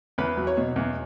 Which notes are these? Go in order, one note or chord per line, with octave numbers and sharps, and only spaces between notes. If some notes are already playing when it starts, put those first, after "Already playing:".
E2 B4
F#3
C#5
B2
E2